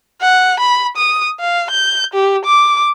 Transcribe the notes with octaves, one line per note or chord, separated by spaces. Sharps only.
F#5
B5
D#6
F5
G6
G4
D6